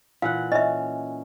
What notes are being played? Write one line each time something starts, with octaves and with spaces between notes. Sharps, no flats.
A#2 E3 F5 F#5
C#4 D#5 E5